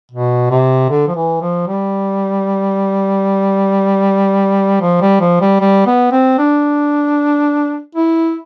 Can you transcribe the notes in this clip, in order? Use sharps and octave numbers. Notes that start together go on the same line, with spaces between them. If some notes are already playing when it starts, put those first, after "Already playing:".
B2
C3
D3
F3
E3
F3
G3
F3
G3
F3
G3
G3
B3
C4
D4
E4